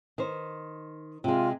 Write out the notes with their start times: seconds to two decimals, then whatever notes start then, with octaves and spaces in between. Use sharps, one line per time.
0.18 D#3 C5
1.24 C3 G#3 F4